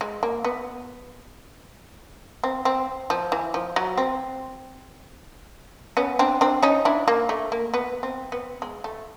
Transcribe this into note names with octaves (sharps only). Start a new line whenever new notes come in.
G#3
A#3
B3
C4
C4
F3
E3
F3
F#3
C4
B3 C#4
C4 D4
C4 D4
C#4 D#4
D4 E4
A#3
A3
A#3
B3
C4
B3
G#3
A3